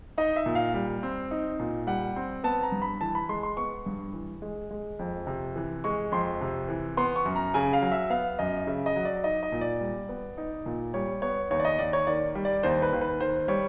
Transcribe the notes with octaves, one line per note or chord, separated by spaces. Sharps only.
D#4 D#5
E5
A#2
F5
G3
C4
D#4
A#2
G3 F#5
C4
B3 A5
A#5
G2
B5
E3 A5
B5
G#3 C6
C6
B3 C#6
G2
E3
G#3
G#3
F2
C3
E3
G#3 C#6
F2 C6
C3
E3
B3 C6
C#6
F#2
A#5
C#3 G#5
F5
F#3
E5
B3 F5
F#2 D#5
C#3 E5
D#5
F#3
D5
D#4 D#5
D#5
A#2
D5
G3
B3
D#4
A#2
G3 C#5
B3 C#5
D#2 C#5
D5
D#5
D#2 D5
C#5
D#3 D5
G3
D5
D#2 C5
B4
D#2
B4
D#3 C5
G3 C#5